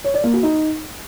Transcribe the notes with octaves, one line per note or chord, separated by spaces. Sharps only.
C#5
D5
A#3
F#4
D#4